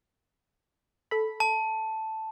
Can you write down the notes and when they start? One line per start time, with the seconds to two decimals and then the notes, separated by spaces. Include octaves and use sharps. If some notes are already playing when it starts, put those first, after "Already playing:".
1.11 A4 B5
1.40 A5